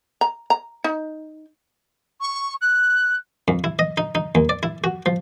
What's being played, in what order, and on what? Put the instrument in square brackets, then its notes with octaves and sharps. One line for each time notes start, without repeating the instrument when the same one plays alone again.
[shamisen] A#5
A#5
D#4
[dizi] C#6
F#6
[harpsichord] F2
E4
D#5
D#4
D#4
D#2
D5
E4
F#4
F3